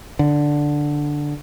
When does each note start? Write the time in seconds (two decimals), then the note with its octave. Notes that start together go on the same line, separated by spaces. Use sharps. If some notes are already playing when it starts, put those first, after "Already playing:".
0.19 D3